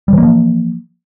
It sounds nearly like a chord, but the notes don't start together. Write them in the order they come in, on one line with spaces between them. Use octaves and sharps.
G3 E3 A#3 F3